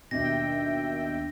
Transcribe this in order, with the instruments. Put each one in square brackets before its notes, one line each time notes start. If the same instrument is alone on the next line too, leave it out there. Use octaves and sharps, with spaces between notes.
[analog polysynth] D#2 E5 G5 [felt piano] B2 [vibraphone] D4 [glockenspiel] A#6